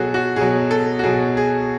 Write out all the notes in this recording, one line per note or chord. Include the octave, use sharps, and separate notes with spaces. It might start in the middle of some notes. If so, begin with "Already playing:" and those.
Already playing: B2 F#3 F#4 G#4 A4
F#4
B2 F#3 G#4
A4
F#4
B2 F#3 G#4
G#4